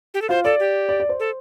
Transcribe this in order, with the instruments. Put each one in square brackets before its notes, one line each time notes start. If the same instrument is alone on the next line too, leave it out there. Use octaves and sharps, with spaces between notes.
[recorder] G4
A4
[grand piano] F4 F5 [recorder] C5
[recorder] A4 [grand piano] D5
[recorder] G4
[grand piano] D5
D5
C5
[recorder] A4